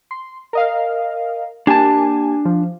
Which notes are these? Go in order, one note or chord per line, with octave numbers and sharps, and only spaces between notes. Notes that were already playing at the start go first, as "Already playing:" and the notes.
C6
A#4 D#5 F5
A#3 D4 G4 G#5 A5
F3